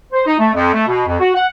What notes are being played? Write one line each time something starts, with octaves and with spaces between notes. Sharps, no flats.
C5
D#4
A3
F2
A3
B2
F2
F#4
F#5